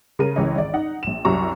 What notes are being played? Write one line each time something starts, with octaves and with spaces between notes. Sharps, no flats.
C#3 A#4 D#7
C#2 E3 C#5 D#5
G#1 D5
D#4 F#5
A#1 E7
C2 F#2 F#3 F#4 A#5 C#6